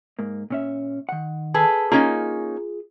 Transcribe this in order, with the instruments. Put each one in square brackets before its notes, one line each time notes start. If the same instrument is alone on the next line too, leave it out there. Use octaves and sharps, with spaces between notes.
[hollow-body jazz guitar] G#2 A#3
A#2 C#4 E5
D#3 F#5
[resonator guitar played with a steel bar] G#4 A4 B4
[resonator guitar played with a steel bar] A#3 C#4 D#4 [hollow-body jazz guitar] F4 G#4 G#5